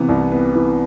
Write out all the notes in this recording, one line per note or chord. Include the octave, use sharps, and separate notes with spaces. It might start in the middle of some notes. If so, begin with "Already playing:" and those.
Already playing: C3 E3 B3
C2
B3
E3